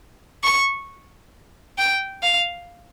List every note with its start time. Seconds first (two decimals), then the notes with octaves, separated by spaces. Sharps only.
0.44 C#6
1.78 G5
2.23 F5